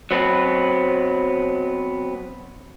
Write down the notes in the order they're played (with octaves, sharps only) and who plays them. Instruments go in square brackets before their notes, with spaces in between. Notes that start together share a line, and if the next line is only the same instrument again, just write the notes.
[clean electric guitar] F#3 B3 C4 B4